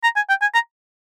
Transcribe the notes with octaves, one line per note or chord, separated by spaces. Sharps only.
A#5
G#5
G5
G#5
A#5